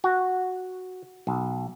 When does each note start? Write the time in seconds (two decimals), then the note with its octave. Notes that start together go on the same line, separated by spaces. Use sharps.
0.04 F#4
1.27 B1